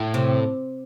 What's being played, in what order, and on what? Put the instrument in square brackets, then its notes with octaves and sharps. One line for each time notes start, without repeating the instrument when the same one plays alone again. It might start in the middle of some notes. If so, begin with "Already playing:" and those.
Already playing: [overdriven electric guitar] A2
[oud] C3